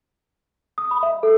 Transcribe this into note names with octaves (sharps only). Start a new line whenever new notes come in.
D#6
B5
E5
A4